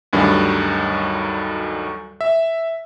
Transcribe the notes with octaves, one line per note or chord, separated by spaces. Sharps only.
D2 G2 D#3 F#3 G3
E5